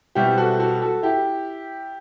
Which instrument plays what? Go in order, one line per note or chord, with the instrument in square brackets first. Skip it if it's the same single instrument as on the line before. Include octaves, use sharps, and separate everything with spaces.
[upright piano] B2 G3 C4 E4 G4
F#4 A4
F#4 A4
F#4 A4
E4 G4